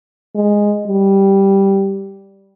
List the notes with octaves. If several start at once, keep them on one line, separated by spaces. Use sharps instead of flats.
G#3
G3